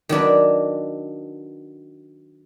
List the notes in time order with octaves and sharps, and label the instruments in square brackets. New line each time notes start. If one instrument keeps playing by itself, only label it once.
[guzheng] D#3 F#3 D4 B4